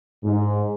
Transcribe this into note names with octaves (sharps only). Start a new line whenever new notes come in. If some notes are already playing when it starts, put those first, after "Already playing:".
G#2